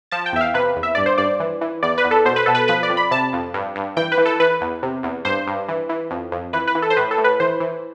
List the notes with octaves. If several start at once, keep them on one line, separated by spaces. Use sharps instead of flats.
F3 A5
G5
E2 E5
F5
C3 B4
E2
E5
G2 D5
C5
G2 D5
E3
E3
E2 D5
B4
E2
A4
B2 C5
B4
B2 A4
B4
F3 B4
D5
F2
B5
C3 A5
F2
G2
G2
E3 G5
B4
E3
A4
E3 B4
E2
C3
E2
G2 C5
G2
E3
E3
F2
F2
E3 B4
B4
E3
A4
C5
A2 B4
A4
A2
B4
E3 C5
E3